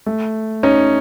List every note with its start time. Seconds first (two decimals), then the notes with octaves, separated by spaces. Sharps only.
0.06 A3
0.63 C#4 D#4